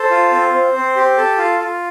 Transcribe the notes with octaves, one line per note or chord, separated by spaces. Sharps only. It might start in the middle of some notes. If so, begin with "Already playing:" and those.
Already playing: A4 C5
F4
C4
C4
C4
G4
A4
F4
F4